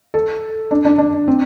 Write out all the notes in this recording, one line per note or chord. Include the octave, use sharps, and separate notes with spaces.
A4
D4
D4
D4
C4